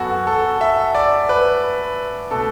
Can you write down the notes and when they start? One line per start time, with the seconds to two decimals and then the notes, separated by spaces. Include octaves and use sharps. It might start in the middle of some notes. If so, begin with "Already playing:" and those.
Already playing: F#2 F#3 B3 F#4 A4
0.27 A4
0.61 E5
0.95 D5
1.29 B4
2.31 B2 A3 A4